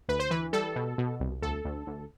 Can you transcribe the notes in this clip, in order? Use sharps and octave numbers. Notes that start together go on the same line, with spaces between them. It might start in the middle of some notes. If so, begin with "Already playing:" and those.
D2 B4
C5
E3 B4
G3 A4
B2
B2
C2
D2 A4
D2
D2